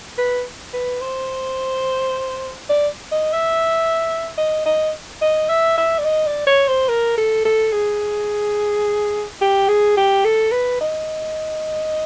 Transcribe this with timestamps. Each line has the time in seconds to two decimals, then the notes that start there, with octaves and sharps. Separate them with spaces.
0.18 B4
0.74 B4
1.01 C5
2.70 D5
3.12 D#5
3.33 E5
4.38 D#5
4.66 D#5
5.22 D#5
5.49 E5
5.78 E5
5.99 D5
6.05 D#5
6.26 D5
6.47 C#5
6.68 C5
6.89 A#4
7.18 A4
7.45 A4
7.72 G#4
9.41 G4
9.68 G#4
9.97 G4
10.25 A4
10.52 B4
10.81 D#5